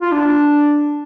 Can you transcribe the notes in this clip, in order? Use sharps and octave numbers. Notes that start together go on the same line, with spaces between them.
F4
D4